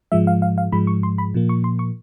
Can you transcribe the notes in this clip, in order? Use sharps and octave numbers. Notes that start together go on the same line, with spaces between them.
G#2 F3 G#3 E5
F5
F5
F5
G#2 F3 G#3 B5
C#6
C6
B5
A#2 F3 A#3
C#6
C6
C#6